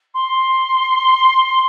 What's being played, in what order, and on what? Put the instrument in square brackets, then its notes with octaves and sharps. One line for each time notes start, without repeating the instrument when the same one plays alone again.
[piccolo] C6